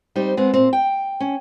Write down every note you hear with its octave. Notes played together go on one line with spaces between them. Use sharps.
G3 C4 D#4 C5
G#3 B3 C4
A#2 C4
G5
C#4